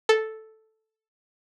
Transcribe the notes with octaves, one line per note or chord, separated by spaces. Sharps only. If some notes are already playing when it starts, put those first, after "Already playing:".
A4